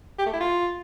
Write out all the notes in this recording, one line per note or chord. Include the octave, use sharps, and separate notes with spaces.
G4
A3
E4
F4